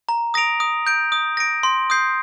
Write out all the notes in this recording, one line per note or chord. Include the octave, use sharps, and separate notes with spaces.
A#5
D#6 A#6 D7 F7
D#6
G6 D7
D#6
A#6 D7
C6
D#6 G6 C7